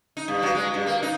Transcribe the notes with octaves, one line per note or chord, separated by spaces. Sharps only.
D#4
G2
F#3
G#3
G2
A#3
D#4